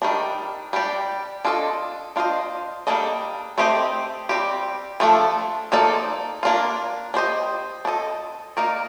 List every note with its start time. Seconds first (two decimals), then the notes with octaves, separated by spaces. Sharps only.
0.02 D#3 G3 D4
0.73 G3 D4 G4 D5
1.45 D4 F4 A4 D#5
2.16 D4 F4 C5 D#5
2.87 G3 A#3 D4 A4 D#5
3.58 A3 C4 G4 C5 D#5
4.29 G3 C4 G4
5.00 F3 A3 D4 A4
5.72 F3 A#3 D#4 A4 D5
6.43 A#3 D4 F4
7.14 D4 G4 C5 D#5
7.85 D4 A4 D#5
8.57 A#3 D#4 A#4 D5